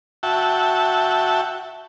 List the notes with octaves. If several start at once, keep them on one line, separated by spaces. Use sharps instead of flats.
F#4 E5 G5 A5